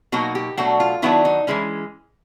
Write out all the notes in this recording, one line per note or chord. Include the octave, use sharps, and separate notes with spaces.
B2 F#3 A#3 D#4 F#4
G4
B2 F#3 A3 D4 F#4
F4
D#3 F#3 B3 D4 E4
D#4
E3 G#3 C#4 E4